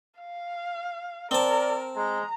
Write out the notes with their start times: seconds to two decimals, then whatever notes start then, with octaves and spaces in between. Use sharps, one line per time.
0.19 F5
1.31 C4 A#4 D5 A5
1.96 G#3 A#5